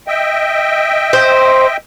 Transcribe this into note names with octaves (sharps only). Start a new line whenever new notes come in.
D#5 E5 G5
C5